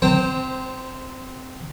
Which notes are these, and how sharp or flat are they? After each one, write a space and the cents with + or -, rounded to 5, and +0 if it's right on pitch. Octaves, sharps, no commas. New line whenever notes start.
C4 -15 C5 +5 A#5 -40